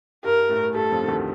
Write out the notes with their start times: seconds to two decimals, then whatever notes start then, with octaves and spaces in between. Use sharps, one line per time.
0.24 G2 G3 A#4
0.49 A2 A3
0.74 G2 G3 A4
0.92 F2 F3
1.03 D#3
1.08 D2 D3